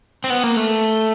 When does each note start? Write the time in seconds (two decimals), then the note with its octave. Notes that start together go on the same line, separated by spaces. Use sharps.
0.24 C4
0.30 B3
0.44 A#3
0.56 A3